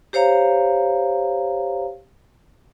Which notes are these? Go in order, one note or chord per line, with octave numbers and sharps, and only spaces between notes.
G4 C5 C#5 F5 A#5